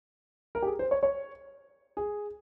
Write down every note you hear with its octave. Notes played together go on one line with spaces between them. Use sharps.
A#4
G4
G#4
C5
C#5
C#5
G#4